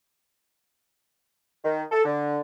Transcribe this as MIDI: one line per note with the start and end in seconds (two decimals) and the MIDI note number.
1.64 1.83 51
1.92 2.03 69
2.05 2.40 50